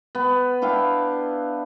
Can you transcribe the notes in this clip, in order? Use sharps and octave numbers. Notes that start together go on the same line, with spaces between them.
B3
D4 E4 F5 G5